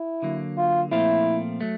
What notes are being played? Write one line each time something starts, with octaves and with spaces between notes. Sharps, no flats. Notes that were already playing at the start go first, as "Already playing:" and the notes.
Already playing: E4
D3 F#3 A#3
F4
A#2 F3 A3 C4 E4 F4
F#3 A3